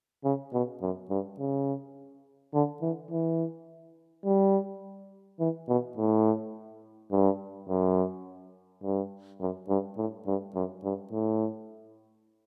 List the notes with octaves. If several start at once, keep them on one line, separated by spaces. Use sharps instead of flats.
C#3
B2
F#2
G2
C#3
D3
E3
E3
G3
E3
B2
A2
G2
F#2
G2
F#2
G2
A2
G2
F#2
G2
A2